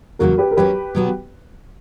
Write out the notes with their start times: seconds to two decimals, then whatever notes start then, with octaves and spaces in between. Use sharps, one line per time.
0.19 E2 C#3 F#3 A#3 F#4 A#4
0.38 G4 B4
0.51 A#4
0.57 F#3 A#3 C#4 G4 B4
0.95 B2 F#3 B3 F#4